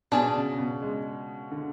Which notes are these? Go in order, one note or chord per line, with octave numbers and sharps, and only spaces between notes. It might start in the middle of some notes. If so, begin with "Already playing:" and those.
B2 D4 G#4 D5
C#3
C#3
B2
G#3
D3